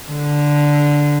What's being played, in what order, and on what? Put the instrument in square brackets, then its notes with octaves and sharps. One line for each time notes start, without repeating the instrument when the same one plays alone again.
[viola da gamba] D3